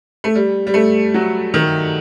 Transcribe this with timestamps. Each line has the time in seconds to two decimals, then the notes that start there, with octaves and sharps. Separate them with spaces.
0.24 A3
0.35 G3
0.67 G3
0.74 A3
1.14 F#3
1.54 D#3